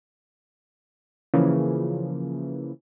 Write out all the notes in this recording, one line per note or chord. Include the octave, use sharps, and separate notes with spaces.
C#3 E3 F3 A#3